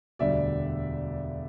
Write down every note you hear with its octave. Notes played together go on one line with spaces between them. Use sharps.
E1 D2 D3 G3 D5 E5